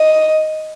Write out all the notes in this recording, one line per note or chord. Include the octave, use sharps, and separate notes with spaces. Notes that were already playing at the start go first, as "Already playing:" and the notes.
Already playing: D#5